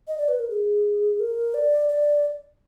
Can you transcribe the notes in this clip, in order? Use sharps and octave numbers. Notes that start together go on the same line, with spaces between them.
D#5
D5
B4
A#4
G#4
A#4
D5
D5